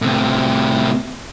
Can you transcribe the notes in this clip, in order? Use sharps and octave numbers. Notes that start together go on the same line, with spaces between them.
A2 C3